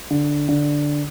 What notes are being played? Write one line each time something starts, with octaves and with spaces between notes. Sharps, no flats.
D3
D3